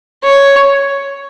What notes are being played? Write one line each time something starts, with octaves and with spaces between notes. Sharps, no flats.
C#5